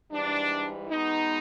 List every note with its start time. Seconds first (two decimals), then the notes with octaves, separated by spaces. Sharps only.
0.12 G#2 E3 G3 D4
0.90 B2 G#3 B3 D#4